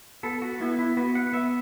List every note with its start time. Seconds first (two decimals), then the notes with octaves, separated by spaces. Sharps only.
0.23 B3 A4
0.42 F#4
0.60 B3 E4
0.79 E4
0.97 B3 F#4
1.15 F#5
1.33 B3 E5